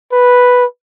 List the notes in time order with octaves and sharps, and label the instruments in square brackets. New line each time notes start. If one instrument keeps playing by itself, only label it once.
[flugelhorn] B4